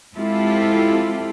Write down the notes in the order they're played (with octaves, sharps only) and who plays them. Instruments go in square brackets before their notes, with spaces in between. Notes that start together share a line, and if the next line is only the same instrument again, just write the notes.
[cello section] G#3 C4 E4 F4 G4 A4